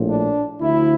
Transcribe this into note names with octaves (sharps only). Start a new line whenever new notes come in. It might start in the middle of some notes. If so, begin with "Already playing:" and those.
Already playing: A#1 A2 F3
D4
D2 D3 F3 E4